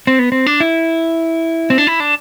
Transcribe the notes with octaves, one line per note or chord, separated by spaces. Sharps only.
C4
B3
C4
D4
E4
C4
D4
E4
D4